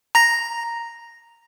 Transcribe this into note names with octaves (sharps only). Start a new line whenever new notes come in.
A#5 A#6